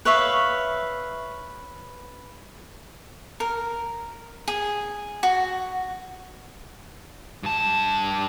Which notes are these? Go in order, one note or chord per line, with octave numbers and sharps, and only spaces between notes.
B4 C#5 E5 F5
A#4
G#4
F#4
G2 A5